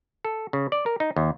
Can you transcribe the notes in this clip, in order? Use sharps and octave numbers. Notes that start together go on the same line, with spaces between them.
A4
C#3
D5
A#4
D#4
D#2